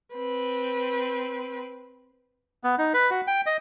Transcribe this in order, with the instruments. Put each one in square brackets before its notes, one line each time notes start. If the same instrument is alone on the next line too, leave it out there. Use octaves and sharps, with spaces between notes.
[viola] C4 B4
[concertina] B3
D#4
B4
F#4
G5
D#5